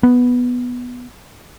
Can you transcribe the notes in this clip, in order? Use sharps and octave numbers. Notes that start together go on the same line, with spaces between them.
B3